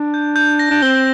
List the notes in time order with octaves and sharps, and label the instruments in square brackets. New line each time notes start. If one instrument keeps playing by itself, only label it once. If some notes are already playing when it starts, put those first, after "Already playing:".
Already playing: [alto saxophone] D4
[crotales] G6
G6
A#6
[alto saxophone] D4
[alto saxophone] C4 [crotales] G7